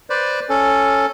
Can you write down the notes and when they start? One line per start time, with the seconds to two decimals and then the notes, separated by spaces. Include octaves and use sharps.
0.10 B4 C5 D5
0.50 C#4 A4